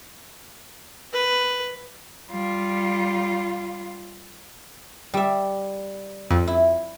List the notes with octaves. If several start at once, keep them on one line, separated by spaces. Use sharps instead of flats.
B4
G3 F4
G3 E5
F2
E4